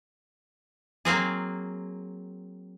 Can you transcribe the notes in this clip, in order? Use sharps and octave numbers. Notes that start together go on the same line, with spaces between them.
F#3 A#3 C4 G#4